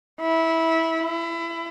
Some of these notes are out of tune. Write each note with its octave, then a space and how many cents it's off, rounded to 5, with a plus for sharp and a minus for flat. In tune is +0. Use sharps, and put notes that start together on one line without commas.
E4 -15
E4 +25